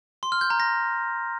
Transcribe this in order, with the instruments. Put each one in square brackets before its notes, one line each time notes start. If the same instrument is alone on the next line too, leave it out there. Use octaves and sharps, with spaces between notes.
[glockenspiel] C6
F6
G6
A#5
A#6